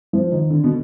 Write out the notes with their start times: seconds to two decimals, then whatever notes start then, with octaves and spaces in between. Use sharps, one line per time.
0.13 F3
0.32 D#3
0.50 D3
0.64 B2